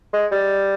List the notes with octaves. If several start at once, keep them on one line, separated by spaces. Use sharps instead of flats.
G#3
G3